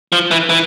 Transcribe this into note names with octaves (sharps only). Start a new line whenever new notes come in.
F3
E3
E3